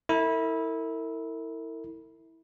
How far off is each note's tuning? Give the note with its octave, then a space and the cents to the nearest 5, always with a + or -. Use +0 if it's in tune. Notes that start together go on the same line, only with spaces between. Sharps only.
E4 -20 A#4 -45